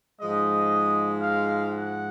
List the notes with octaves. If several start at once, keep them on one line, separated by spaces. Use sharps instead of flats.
G#2 F3 G#3 D#5
F5
F#5